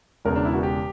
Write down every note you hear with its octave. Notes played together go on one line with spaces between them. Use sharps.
E1 E2 C#3 A#4
D4
E4
F#4
G4